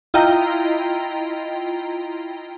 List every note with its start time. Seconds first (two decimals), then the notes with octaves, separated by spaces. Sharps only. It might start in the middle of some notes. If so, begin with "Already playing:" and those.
0.14 E4 F4 D#5 G5 A#5